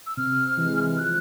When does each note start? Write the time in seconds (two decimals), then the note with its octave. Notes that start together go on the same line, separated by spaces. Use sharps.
0.07 E6
0.17 C3 F6
0.57 E3 G#3
0.88 F6
0.97 F3 F#6